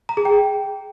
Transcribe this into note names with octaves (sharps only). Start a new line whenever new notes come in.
A#5
G#4
G5